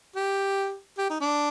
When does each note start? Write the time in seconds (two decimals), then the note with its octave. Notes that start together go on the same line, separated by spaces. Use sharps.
0.16 G4
0.98 G4
1.10 D#4
1.20 D4